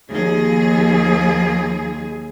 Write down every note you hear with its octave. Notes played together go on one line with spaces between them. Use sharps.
D#2 F3 G#4